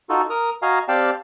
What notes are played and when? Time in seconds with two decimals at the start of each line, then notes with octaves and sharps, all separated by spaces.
0.10 D#4 F4 F#4 A4
0.30 A#4 D#6 F6
0.62 F#4 D#5 F5 G#5 A#5
0.88 C4 G4 D5 F5 G5 A5